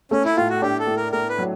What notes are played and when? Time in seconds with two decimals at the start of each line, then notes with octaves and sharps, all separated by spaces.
0.11 A3 C#4
0.25 E4
0.37 A2 F4
0.50 F#4
0.62 D4 G4
0.80 A4
0.87 A2
0.97 A#4
1.12 A3 A#4
1.29 B4
1.39 F#3